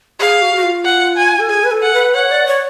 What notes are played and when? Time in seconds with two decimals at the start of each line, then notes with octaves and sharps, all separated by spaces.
0.20 G#4 F5
0.42 F#4
0.56 F#4
0.63 F4
0.85 F#5
1.18 G#5
1.39 A4
1.50 G#4 G#5
1.64 B4
1.71 A4
1.82 F#5
1.93 B4
2.14 C#5 F#5
2.31 D5
2.47 C#5